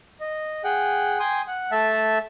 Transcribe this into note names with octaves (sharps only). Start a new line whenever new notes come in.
D#5
G#4 F#5 G5
G5 G#5 C6 D#6
F#5
A3 E5 A5